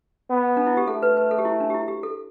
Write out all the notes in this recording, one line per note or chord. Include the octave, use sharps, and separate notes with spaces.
B3
D4
E4
G4
A3 A4
B4
B4
A4
G4
E4
D4
G4
E4
G4
A4